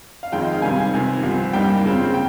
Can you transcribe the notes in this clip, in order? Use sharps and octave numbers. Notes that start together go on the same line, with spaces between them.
F5
F2 D#3 G#3 C4 F4 G5
D#5
F5
C#2 C3 D#3 G3 C4 G#5
C#2 C3 D#3
C2 C3 F3 C4
G2 G3 A#3 D#4 G5
C#3 G#3 C4 F4
G5